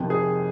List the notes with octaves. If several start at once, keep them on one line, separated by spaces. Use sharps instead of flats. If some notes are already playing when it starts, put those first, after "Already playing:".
Already playing: F2 C3 D#3
G#4